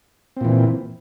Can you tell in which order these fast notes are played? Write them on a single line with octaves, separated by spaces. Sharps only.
C4 A#2 E3